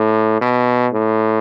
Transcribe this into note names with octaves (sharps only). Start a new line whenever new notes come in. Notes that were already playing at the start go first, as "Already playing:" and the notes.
Already playing: A2
B2
A2